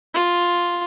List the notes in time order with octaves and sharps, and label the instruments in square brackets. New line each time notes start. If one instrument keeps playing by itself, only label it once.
[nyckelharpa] F4